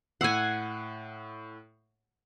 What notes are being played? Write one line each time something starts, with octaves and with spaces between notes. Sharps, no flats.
A2 F#5 G#5 E6 C7